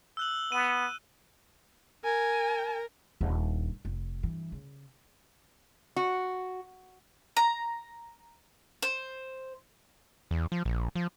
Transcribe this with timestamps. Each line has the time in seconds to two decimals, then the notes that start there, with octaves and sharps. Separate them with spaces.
0.17 E6 F#6 F#7
0.52 B3 D#7
2.04 A#4 G#5
3.21 D#1 D4
3.85 F1
4.23 G2 E3
4.52 C#3
5.96 F#4
7.37 A#5
8.83 C5
10.31 E2
10.52 F3
10.65 A#1
10.96 F3